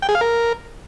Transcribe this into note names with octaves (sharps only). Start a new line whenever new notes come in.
G5
G#4
F5
A#4